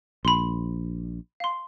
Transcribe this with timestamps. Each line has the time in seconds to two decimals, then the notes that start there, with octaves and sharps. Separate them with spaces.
0.25 A#1 B5 C6
1.40 F5 C6